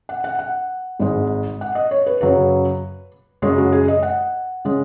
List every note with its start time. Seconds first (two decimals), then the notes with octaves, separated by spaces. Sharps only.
0.09 F#5
0.24 F#5
0.39 F#5
1.00 G#1 G#2 G#3
1.61 F#5
1.75 D#5
1.91 C#5
2.06 B4
2.21 F#2 C#3 F#3 B4
3.42 F#2 C#3 G#3 C#5
3.58 F#4
3.72 G#4
3.88 D#5
4.03 F#5
4.65 C#3 G#3